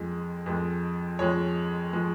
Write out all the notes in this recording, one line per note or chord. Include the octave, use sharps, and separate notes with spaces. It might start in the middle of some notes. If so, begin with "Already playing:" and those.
Already playing: F2 F3 G#3
F2 F3 G#3
F2 F3 G#3 C#5
F3 G#3